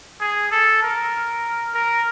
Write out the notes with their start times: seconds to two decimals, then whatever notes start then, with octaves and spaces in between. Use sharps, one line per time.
0.21 G#4
0.51 A4
0.83 A#4
1.74 A#4